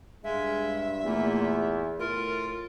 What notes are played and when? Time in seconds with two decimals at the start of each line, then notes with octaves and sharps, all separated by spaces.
0.24 G2 G#3 E5 F5
1.03 E2 A#2 A3
1.99 A2 F4 A#4 A6